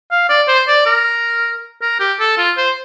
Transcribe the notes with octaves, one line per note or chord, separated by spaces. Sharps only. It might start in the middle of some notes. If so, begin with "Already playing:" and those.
F5
D5
C5
D5
A#4
A#4
G4
A4
F4
C5